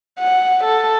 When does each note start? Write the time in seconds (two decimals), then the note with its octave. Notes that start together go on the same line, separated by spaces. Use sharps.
0.20 F#5
0.64 A4